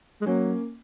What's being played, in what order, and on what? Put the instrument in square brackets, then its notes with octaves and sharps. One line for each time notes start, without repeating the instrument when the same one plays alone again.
[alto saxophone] G#3
[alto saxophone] F#3 [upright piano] A#3 C#4